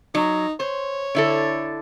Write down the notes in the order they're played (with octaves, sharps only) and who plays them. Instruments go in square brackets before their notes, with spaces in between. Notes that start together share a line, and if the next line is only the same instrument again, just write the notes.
[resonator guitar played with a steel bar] F#3 [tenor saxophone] D#4
[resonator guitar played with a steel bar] C5 [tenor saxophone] C#5
[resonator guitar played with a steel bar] D3 E4 A4